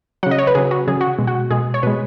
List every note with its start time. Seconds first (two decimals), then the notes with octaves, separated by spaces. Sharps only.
0.23 C#3 F#3 F#5
0.31 D#5
0.38 C#5
0.47 B4
0.55 C#3 F#3 G#4
0.71 F#4
0.87 C#3 F#3 G#4
1.01 F#4
1.19 B2 G#3
1.27 F#4
1.51 B2 G#3 G#4
1.74 C#5
1.83 B2 G#3 B4